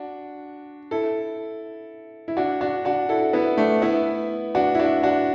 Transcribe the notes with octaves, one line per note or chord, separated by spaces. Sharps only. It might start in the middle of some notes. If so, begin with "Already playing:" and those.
Already playing: D4 F#4
E4 A4
E4
D4 F#4
D4 F#4
D4 F#4
E4 A4
B3 E4
A3 D4
B3 E4
D4 F#4
E4
D4 F#4
D4 F#4